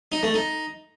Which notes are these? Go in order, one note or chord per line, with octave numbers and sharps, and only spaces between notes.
D#4
A3
D#4